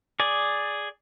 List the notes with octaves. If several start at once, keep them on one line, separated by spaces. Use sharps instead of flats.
G#4 D5